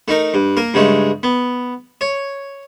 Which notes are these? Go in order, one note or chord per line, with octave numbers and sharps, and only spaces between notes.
A3 D#4 A#4
G2
A#3 A#4
G2 C#3 G#3 A3
B3
C#5